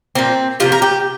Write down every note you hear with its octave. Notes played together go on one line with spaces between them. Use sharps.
A#2 F3 A#3 C4
C3 F3 A#3 F4
A#4
G4